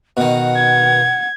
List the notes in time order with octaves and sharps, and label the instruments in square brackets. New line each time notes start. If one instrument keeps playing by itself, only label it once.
[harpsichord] B2 D#3 [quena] F#5
[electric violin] G#6